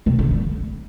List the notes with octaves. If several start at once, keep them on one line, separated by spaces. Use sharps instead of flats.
C3
D3
G3